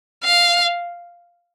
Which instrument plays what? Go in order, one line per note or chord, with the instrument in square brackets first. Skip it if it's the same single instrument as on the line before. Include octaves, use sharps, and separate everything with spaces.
[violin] F5